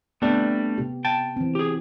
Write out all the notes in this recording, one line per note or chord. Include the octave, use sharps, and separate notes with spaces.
G3 A3 B3 C4 D4
C3 G4
G5 A5
E3 C4
G4 G#4